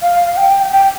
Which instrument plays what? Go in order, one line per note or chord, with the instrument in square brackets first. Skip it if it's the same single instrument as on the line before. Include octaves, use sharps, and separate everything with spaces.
[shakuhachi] F5
G5
G5